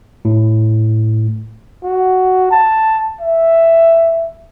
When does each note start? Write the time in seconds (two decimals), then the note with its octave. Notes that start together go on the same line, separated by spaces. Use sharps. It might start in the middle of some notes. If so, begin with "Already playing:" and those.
0.25 A2
1.83 F#4
2.51 A5
3.21 E5